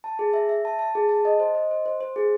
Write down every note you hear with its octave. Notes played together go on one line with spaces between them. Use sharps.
A5
G#4
E5
E5
A5
A5
G#4
A5
D#5
C5
D#5
C5
C5
C5
G#4